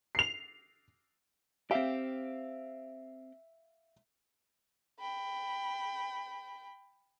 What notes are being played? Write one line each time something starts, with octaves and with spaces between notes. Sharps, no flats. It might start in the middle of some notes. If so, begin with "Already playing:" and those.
C7 F7
C4 G4 E5 F5
G5 B5